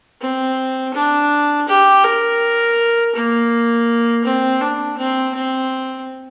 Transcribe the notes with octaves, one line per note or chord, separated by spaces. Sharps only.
C4
D4
G4
A#4
A#3
C4
D4
C4
C4